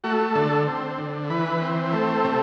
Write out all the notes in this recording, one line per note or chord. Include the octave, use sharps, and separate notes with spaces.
A3 F#4
D3 A4
C4
D3
E3 B4
C4
A3
C3